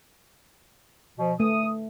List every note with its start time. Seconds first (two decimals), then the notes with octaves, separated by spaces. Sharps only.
1.17 B2 F3
1.40 A3 D#6